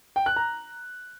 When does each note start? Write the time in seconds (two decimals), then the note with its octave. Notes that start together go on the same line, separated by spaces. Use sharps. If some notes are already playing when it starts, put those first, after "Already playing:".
0.16 G5
0.26 F#6
0.36 A#5